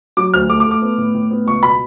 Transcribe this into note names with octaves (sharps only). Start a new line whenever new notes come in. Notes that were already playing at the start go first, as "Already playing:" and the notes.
F#3 D6
D2 F6
A3 D6
D6
A3
D6
B3
A2
A2
B3
C#2 C#6
B2 B5